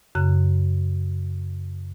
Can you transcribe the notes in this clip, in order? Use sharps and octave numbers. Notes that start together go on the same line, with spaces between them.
F#2 C#3 F#6